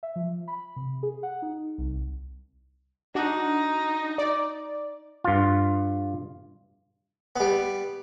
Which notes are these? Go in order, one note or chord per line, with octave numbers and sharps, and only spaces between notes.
E5
F3
B5
C3
G#4
F#5
D#4
C2
D4 D#4 F#4
D5
G2 F4
G3 B3